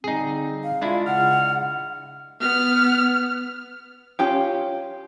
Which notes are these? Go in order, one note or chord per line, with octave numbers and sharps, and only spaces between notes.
D3 G3 C4 D#4 G#4
F5
G#3 D4 E4 F4
C#3 F#5 F6
B3 F6
C#4 F4 G4